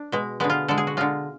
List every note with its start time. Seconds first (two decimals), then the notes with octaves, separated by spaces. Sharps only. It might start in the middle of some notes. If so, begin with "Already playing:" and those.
Already playing: D4
0.12 B2 G#3
0.40 D3 G#3 B3
0.50 F4
0.68 D3 G#3 A4
0.78 G#4
0.87 F#4
0.97 D3 G#3 F4